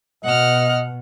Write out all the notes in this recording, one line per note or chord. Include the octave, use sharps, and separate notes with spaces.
B2 D#5 F#5 F6